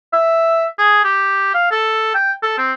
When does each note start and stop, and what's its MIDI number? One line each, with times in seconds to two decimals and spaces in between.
0.13 0.65 76
0.78 1.02 68
1.04 1.54 67
1.54 1.66 77
1.71 2.10 69
2.15 2.32 79
2.43 2.58 69
2.58 2.73 60